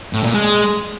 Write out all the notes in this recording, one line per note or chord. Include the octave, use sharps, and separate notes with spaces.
A2
A#2
G#3